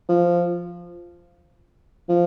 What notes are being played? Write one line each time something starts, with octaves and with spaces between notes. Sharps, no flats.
F3
F3